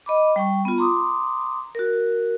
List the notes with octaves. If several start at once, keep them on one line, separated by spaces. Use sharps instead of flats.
D#5 B5 D6
G3 G5 C#6
B3 F4
A#5 C6 D6 D#6
F#4 A#4